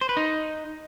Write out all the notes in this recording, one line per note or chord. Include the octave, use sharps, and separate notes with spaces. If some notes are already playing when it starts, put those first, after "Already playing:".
C5
B4
D#4